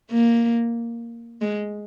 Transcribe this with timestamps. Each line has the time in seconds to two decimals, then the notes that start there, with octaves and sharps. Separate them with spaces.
0.11 A#3
1.41 G#3